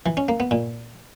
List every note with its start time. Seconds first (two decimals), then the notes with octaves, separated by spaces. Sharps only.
0.06 E3
0.17 C#4
0.28 A#3
0.40 B3
0.51 A#2